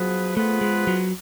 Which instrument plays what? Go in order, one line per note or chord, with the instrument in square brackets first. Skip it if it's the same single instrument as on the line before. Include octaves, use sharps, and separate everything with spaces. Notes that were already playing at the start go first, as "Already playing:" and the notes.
Already playing: [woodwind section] F3 B3 F4 G#4 B4 [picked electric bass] F#3
[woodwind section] F3 B3 F4 G#4 B4 [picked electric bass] A3
[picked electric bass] G#3
F#3